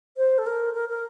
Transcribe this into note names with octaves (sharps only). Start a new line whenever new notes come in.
C5
A4
A#4
A#4
A#4